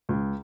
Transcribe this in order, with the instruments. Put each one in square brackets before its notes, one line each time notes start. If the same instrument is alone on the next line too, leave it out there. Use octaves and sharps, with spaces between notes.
[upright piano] C#2